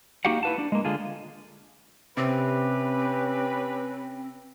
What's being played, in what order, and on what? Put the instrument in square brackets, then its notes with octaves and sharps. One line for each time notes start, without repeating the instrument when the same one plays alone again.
[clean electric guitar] A#3 D#4 F#4 G4 F5 F#5
E4 B4 A5
D4
G#3 A#3
D3 F4 G#4
[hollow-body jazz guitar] C3 [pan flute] C4 [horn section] C#4 G4 B4